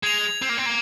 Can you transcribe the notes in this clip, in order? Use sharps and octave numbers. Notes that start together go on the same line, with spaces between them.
G#3 G#6 F7
C4
A#3
C4
A#3